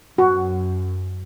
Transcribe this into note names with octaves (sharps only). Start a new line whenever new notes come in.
F#2 F#4